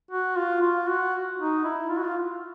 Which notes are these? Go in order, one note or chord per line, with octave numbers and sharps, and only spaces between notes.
F#4
F4
F4
F#4
D#4
E4
F4
F#4
F4